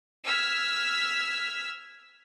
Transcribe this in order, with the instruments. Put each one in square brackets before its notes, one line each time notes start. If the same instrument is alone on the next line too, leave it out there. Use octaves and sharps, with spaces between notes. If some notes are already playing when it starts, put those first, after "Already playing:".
[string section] E6 F6 G#6 B6